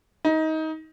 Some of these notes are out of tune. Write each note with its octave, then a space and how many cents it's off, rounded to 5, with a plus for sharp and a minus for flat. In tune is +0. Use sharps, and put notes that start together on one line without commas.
D#4 +25